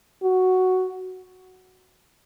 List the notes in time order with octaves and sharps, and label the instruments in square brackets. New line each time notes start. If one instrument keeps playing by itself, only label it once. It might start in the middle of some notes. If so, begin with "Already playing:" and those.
[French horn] F#4